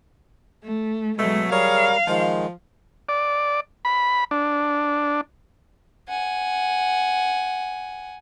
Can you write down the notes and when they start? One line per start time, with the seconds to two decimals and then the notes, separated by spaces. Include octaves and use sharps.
0.63 A3
1.18 B2 F#3 G#3 A3
1.51 G3 G#4 A#4 C#5 F5
2.07 D#3 F3 G#3
3.09 D5
3.85 B5
4.31 D4
6.08 F#5 G#5